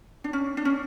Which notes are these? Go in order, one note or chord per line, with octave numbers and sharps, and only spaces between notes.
D4
C#4
D4
C#4